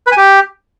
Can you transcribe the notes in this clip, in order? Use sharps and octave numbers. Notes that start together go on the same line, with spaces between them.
B4
G#5
G4